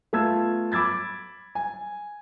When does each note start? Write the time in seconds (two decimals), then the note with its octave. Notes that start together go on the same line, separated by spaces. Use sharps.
0.13 A3 B3 F4 A5 E6 G#6
0.72 B5 D6 E6 G#6 A6
1.55 G#5